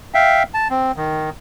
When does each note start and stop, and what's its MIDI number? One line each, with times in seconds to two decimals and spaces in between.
0.14 0.43 76
0.14 0.43 77
0.14 0.43 79
0.54 0.68 81
0.70 0.92 60
0.97 1.30 51